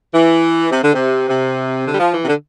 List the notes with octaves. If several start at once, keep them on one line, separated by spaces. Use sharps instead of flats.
E3
C3
D3
C3
C3
D3
G3
F3
E3
C3
D3